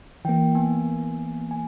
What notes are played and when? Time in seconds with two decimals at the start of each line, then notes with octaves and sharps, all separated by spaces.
0.25 E3 A#3 G5
0.55 B3 G#5
1.51 G#5